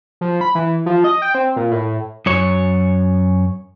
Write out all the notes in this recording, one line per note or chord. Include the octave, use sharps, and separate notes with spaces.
F3
B5
E3
F3
D#5
G5
C4
A#2
A2
F#2 C#5